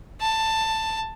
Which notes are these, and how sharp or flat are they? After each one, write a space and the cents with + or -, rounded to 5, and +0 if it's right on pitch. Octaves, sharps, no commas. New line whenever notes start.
A5 +10